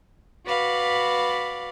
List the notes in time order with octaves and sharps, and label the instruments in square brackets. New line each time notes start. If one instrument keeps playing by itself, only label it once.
[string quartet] F#4 B4 D5 F5 B5